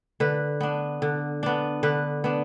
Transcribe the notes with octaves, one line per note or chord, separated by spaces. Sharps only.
D3 B4
B3 D4
D3
B3 D4
D3 B4
B3 D4